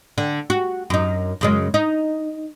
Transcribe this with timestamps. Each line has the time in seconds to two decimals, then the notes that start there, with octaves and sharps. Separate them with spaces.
0.18 D3
0.50 F#4
0.90 F#2 D#4
1.41 F#2 C#3 G#3
1.74 D#4